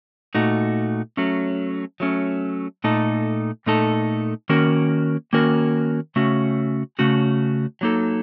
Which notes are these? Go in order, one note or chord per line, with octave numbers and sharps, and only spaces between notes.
A#2 A3 D#4 F#4
F#3 A3 C#4
F#3 A3 C#4
A#2 A3 D#4 A4
A#2 A3 D#4 A4
D#3 A#3 C#4 F#4 A#4
D#3 A#3 C#4 F#4 A#4
C#3 A3 C#4 F#4
C#3 A3 C#4 F#4
F#3 A#3 D#4 A4